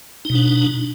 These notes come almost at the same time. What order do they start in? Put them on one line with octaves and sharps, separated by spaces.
D#4 B2 D4